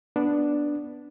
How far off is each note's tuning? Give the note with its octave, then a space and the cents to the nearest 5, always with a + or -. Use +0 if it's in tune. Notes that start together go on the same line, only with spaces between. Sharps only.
B3 -5 D4 +0